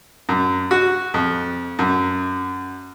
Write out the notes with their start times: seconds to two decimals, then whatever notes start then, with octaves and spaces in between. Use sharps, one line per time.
0.29 F#2
0.71 F#4
1.14 F2
1.79 F#2